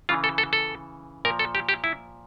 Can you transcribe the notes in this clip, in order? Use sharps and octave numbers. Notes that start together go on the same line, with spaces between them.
C#3 E3 F4
A4
A4
A4
A#2 F3 A#4
A4
G4
G4
E4